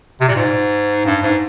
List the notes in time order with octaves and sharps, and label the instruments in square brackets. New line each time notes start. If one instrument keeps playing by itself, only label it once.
[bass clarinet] C3
A#2
G#2
G2
G#2